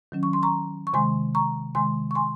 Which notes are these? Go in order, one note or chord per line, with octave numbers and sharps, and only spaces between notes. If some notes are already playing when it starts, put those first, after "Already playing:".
D#3 F#3 C#4
C#6
C6
A#5 C#6
C#6
C3 D#3 G#3 G#5 C6
A#5 C#6
C3 D#3 G#3 G#5 C6
C#6
G#5 C6